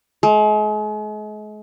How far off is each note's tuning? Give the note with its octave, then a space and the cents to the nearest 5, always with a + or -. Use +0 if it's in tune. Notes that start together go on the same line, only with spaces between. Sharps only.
G#3 +40